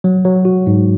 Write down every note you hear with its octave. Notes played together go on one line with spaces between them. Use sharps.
F#3
F#3
F#4
G#2